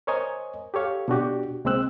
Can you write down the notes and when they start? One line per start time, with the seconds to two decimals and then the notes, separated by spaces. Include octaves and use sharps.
0.07 A#4 C5 C#5 D#5 G#5 A#5
0.74 G4 A4 C#5 F5
1.08 B2 D4 F#4 G4
1.65 C2 G#3 A#3 C4 E6 F#6